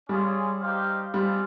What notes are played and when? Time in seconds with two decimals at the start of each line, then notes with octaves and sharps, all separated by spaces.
0.09 G3 C#4 F4 G#4
0.62 D#4 G4 C5 F5
1.14 G3 G#3 C4 F4